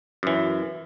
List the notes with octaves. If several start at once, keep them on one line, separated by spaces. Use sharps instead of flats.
F#2 E3